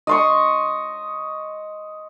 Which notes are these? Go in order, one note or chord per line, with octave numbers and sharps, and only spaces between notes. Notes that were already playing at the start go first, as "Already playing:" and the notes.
D#5 C6 C#6